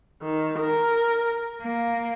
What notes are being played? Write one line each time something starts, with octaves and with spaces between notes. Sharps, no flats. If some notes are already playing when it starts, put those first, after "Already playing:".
D#3
A#4
A#3